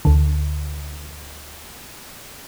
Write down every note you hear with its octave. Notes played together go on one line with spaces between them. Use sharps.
D2 D3